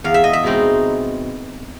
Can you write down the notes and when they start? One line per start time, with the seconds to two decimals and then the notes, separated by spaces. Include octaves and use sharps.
0.04 E2 F5
0.14 E5
0.24 D#5
0.33 E5
0.44 B2 G#3 C4 D#4